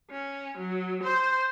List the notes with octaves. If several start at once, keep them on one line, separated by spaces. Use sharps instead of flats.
C#4
F#3
C5